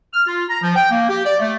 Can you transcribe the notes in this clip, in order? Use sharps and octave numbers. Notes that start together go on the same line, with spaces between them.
F6
F4
A#5
F3
G5
A#3
G4
D5
A3